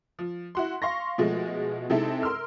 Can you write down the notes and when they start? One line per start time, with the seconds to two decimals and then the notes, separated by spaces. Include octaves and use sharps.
0.19 F3
0.55 E4 F#4 C6
0.82 F5 C6 C#6 A#6
1.18 B2 F3 G#3 A3
1.90 C3 G#3 C4 D#4 E4 A4
2.23 A#4 C6 E6 F6